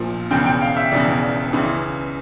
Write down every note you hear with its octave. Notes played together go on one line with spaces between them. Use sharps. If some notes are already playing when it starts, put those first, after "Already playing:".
Already playing: A#1 A#2 F3
E1 E2 C#3 G5
G5
F5
E5
E1 E2 C#3 D5
C#2 C#3 E3